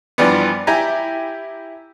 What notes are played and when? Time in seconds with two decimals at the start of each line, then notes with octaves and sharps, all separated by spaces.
0.18 G2 E3 F3 G3 B3
0.67 E4 G4 G#5 A#5